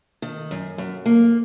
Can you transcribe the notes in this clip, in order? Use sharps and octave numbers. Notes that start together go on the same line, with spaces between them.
D#3
F#2
F#2
A#3